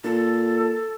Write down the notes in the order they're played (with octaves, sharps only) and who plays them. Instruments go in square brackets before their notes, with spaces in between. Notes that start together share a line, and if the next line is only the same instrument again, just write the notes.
[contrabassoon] A#2 [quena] A4